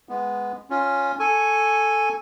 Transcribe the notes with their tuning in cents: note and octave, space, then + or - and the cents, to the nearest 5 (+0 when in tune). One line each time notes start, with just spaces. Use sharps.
G#3 +0 B3 +0
C#4 +0 F4 +5
A4 +0 G#5 +0 C#6 +0